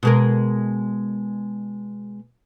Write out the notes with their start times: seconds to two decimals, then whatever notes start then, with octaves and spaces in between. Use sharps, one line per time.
0.03 B2 G#3 A#4